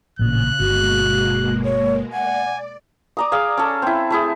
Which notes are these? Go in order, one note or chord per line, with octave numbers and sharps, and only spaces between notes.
A1 A#2 C#3 F#6
G1 B2 G#3 A#3 F#4
C#5
D5 F#5 G#5
D5 A#5 D#6
G#4 D5 F5
C#4 A4
C4 E4
A3 E4 G#4